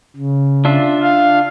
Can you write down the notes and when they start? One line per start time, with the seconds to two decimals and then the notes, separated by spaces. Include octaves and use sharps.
0.16 C#3
0.65 D4 F4 E5
1.02 F5